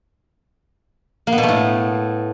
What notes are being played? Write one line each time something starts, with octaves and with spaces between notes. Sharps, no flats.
A#3
B3
B2
A3
A2